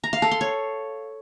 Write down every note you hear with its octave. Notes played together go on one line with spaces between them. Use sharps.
A#5
F5
A4
C6
C#5